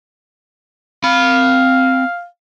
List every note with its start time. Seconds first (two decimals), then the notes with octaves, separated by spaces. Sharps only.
1.04 C4 F5 B5